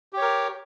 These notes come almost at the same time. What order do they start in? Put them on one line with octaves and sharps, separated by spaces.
G4 C#5 A#4